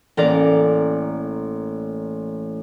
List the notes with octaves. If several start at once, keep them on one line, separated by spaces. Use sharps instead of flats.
A1 A#3 A#4 D5